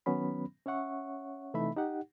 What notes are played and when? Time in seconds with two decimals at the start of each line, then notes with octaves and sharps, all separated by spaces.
0.06 D#3 F#3 B3 C#4 B5
0.66 C#4 C#5 E5 F#5 C#6
1.54 C3 E3 A3 D#4 E5 B5
1.76 D#4 G4 F#5